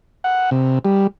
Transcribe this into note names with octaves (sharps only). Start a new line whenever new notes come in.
F#5
C3
G3